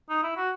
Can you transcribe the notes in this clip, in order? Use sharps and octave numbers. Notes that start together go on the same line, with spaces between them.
D#4
E4
F#4